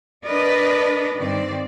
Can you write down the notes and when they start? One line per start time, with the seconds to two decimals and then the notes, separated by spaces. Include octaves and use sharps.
0.25 D4 A#4 B4 D5 D#5
1.16 G2 D#3 C4 D5